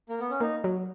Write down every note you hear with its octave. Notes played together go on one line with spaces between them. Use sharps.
A#3
B3
C#4
A#3 D#4
F#3